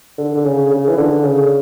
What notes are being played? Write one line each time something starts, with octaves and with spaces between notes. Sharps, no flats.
D3
D3
C#3
C#3
E3
D3
C#3